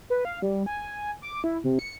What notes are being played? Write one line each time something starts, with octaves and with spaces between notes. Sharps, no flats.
B4
F5
G3
G#5
D6
E4
C3
C#7